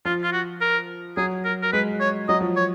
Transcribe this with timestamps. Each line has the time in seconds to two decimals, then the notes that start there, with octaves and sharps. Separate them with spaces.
0.05 F3 F4
0.23 F4
0.32 F#4
0.61 A#4
1.17 F#3 G#4
1.45 A#4
1.62 A#4
1.73 G#3 B4
2.01 C#5
2.29 F#3 D#5
2.41 F3
2.57 C#5